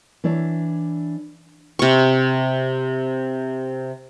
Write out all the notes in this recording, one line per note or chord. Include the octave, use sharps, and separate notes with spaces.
E3 D4 E4 C#5 D5
C3 C#6